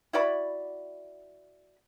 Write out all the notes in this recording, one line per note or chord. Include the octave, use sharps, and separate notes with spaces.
E4 F#4 D5 B5